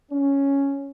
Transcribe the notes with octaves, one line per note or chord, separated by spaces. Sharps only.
C#4